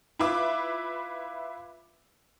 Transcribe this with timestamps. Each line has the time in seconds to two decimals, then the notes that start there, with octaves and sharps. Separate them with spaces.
0.19 E4 F4 B4 E5 D6